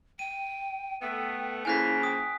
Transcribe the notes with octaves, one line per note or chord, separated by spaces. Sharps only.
G5 D#7
A3 B3 G5
C#3 F3 A#3 E4 G#5 F#6 B6
G5 D#6